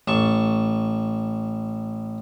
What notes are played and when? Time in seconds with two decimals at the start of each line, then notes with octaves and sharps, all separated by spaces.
0.08 A1 A5 C#6